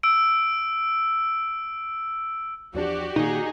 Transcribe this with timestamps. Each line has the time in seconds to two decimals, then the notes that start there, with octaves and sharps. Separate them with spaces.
0.03 E6 D7
2.75 E2 F3 D4 F#4 G4 D5
3.16 A#2 D#3 A#3 D#4 G#4